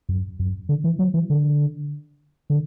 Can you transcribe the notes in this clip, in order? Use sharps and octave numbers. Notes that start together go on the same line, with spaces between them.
F#2
F#2
D3
E3
F#3
E3
D3
D3